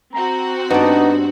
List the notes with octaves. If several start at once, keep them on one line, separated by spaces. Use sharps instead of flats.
C4 F#4 A#5
G2 B3 D#4 D5